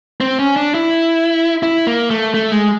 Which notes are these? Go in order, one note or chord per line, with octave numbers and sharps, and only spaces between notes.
C4
C#4
D4
E4
E4
A#3
A3
A3
G#3